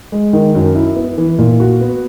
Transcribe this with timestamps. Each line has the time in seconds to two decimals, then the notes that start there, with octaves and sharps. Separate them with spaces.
0.12 G#3
0.33 D#3
0.55 F#2
0.75 E4
0.96 B3
1.18 E3
1.38 A#2
1.60 F#4
1.81 B3